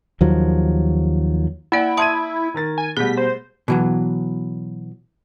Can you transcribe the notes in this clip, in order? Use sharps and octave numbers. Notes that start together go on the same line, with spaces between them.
D#2 F3 F#3
A#3 E4 D5 F#5 D7
E5 A5 C6 D#6 G#6 D#7
D#3 A#4 A6
G#5
B2 G3 A3 G#4 B6
C5
B2 E3 F#3